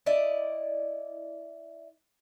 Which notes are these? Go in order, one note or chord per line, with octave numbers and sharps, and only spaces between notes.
E4 D5 D#5